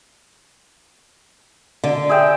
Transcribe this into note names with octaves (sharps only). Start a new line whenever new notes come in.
D3
G#4 E5 G5